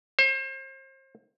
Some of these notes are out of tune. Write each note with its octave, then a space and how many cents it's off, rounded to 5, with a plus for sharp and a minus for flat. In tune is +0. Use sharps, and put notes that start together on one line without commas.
C5 +35